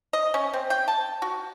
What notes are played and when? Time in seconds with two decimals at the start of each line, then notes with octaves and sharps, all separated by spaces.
0.13 D#5
0.34 C#4
0.53 C4
0.70 G5
0.88 A5
1.22 F#4